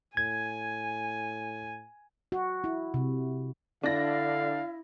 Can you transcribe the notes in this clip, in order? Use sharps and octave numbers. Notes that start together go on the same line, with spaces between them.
A2 G#5 G#6
F#4
E4
C3
D3 D4 E4 F5 A#6